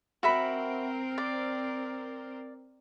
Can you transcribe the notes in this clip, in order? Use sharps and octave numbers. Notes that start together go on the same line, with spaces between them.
C4 F#4 A#4 E5 B5
D5